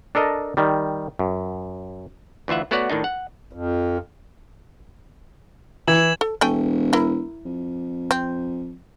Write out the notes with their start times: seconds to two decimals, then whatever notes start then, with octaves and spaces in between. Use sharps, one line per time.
0.15 D4 A4 A#4 D#5
0.57 D#3 G3
1.19 F#2
2.48 D2 E3 F4 E5 F#5
2.71 A3 B3 F#4 C#5 D5 F#5
2.90 A2 D#3 D4 D#4
3.04 F#5
3.53 F2
5.88 E3 G#6 E7 F#7
6.21 A4
6.41 E1 A3 G5 G#5
6.93 E4 A#4
7.45 F2
8.11 C4